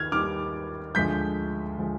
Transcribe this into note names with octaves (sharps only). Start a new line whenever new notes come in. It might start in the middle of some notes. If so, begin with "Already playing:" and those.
Already playing: D#2 D#3 F6 G#6
D#2 D#3 G3 D6 F6
D2 D3 F3 G#3 G6 B6
D3 F3 G#3